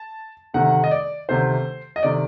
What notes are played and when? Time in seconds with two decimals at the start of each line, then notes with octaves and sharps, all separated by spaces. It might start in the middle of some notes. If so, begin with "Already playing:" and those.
Already playing: A5
0.54 D2 C3 D#3 A3 F#5
0.84 D#5
0.91 D5
1.29 D2 C3 D#3 A3 C5
1.96 D#5
2.03 C3 D#3 A3 D5